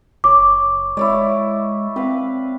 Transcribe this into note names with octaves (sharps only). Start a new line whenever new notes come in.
F#1 C#5 D6
G#3 E4 C#5 D5
C4 B4 F5